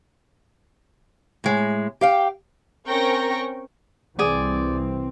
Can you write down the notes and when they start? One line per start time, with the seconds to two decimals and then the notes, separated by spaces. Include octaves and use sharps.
1.44 A2 G#3
2.01 G4 F5 G5
2.88 C4 C#4 A#4 G5 C#6 A#6
4.19 C2 E3 C4 G#4 D5